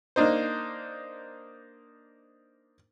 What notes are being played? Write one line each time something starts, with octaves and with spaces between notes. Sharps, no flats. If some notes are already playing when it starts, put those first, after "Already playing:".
A#3 D4 D#4 C5